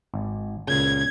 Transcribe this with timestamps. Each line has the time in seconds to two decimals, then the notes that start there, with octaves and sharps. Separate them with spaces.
0.14 G#1
0.67 C#2 A#2 C#3 G#6